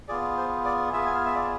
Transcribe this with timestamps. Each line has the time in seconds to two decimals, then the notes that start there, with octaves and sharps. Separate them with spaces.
0.08 B3 F4 G#4 D5
0.37 C5
0.65 D5
0.93 B3 F4 G#4 E5
1.06 G#5
1.15 F5
1.25 E5
1.35 D5